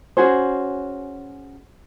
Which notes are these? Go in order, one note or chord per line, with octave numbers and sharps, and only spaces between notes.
C#4 F#4 G#4 C5